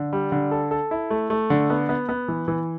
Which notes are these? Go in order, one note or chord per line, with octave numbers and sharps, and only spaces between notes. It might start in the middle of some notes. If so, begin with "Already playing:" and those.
Already playing: D3
G3
D3
A4
A4
E4
A3
A3
D3
B3
B3
B3
E3
E3